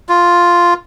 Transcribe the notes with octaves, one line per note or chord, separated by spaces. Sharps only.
F4